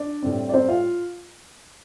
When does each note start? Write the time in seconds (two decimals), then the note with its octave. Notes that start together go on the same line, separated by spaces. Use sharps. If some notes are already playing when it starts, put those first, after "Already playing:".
Already playing: D4 D5
0.23 A2 G3 C4
0.49 D5
0.54 C4 C5
0.68 F4 F5